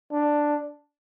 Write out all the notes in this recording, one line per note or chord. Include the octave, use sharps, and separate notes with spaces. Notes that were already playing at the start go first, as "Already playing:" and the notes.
D4